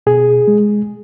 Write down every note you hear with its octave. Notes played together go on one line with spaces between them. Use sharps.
B2 G#4
G#3